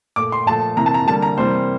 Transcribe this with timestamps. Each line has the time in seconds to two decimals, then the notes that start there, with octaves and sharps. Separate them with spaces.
0.16 A#2 A3 D6
0.32 C6
0.46 A#2 F3 A3 A5
0.77 C3 E3 A#3 A#5
0.86 A5
0.94 A#5
1.07 D3 G3 A#3 A5
1.22 A#5
1.38 C3 E3 G3 A#3 C5